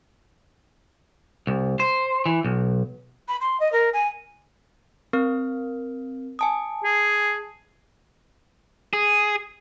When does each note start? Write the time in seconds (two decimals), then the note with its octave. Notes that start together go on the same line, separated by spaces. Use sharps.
1.47 C2
1.80 C5
2.26 E3
2.45 B1
3.28 B5
3.40 C6
3.60 D#5
3.72 A#4
3.93 G#5
5.13 C4 A#4 F6
6.39 G#5 A5 D#6
6.84 G#4
8.93 G#4